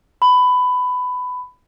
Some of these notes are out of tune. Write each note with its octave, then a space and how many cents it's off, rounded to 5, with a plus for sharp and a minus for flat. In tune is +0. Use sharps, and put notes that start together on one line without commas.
B5 +15